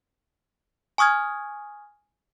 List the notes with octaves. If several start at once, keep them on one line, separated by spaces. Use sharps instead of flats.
G#5 C#6 D#6 F6 G#6